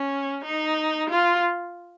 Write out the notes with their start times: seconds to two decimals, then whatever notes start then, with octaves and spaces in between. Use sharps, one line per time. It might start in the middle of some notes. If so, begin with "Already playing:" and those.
Already playing: C#4
0.45 D#4
1.10 F4